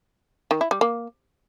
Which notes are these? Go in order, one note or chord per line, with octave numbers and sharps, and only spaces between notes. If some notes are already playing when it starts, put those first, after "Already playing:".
D#3
E4
G3
A#3